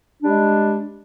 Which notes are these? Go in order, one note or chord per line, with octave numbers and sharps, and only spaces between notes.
G3 G#3 D4